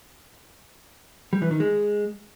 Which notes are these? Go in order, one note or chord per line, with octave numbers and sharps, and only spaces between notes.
G3
E3
D#3
G#3